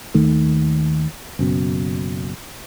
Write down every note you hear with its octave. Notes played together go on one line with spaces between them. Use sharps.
D#2 D#3 A3
F#1 F#2 B2